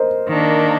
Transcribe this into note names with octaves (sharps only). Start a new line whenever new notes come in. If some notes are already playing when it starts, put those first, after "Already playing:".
Already playing: A#4 C5 D#5
D#3 A#3 D4